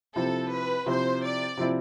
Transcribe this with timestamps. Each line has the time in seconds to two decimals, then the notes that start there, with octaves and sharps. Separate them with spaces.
0.15 C3 F3 C4 E4 A4
0.52 B4
0.86 C3 F3 C4 E4 C5
1.23 D5
1.57 C3 F3 C4 E4